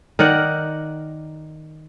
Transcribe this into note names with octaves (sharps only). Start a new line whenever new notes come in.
D#3 A#4 D5 F#5